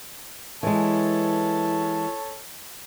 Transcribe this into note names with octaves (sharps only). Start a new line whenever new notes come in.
E3 G#3 A4 C#5 A5